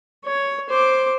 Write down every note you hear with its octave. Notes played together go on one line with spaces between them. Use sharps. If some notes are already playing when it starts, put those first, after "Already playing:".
C#5
C5 D6